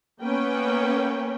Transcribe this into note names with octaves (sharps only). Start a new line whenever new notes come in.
A#3 B3 C#4 B4 G5